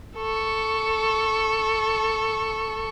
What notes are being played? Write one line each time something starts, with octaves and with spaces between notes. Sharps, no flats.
A4 C#6